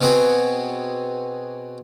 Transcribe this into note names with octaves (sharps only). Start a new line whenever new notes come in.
B2 B3 C4 F#4 G#4